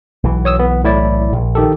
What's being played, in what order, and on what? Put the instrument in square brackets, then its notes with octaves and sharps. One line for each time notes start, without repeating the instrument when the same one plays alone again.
[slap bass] B1 E3
[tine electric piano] C#5 D#6 E6
B3
A2 E4 D5
[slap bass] A#1
[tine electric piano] D#3 G4 A4